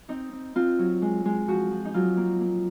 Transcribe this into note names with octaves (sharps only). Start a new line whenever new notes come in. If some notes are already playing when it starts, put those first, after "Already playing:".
C4 D#4
C4
C4 F4
F#3
G#3
G#3
F3 F#4
F3
D#4
F#3 F4
A#3
A#3